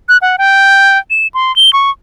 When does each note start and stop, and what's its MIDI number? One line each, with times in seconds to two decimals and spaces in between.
0.09 0.18 90
0.22 0.36 78
0.38 0.98 79
1.10 1.28 100
1.34 1.54 84
1.56 1.73 103
1.73 1.90 85